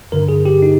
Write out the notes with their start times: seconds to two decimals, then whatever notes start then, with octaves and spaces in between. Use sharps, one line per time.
0.12 G1 G2 D3 A#4
0.29 G#4
0.45 G4
0.62 D#4